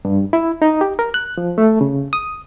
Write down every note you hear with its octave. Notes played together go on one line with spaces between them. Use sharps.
G2
E4
D#4
G4
A#4
F#6
F3
A3
C#3
D#6